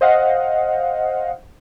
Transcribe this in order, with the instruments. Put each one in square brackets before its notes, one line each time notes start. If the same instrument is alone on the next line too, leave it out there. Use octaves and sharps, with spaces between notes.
[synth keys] C5 D#5 F5 F#5